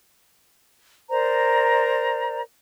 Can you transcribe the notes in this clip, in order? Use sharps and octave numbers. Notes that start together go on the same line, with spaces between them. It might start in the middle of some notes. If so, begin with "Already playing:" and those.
A#4 C5 D5 A#5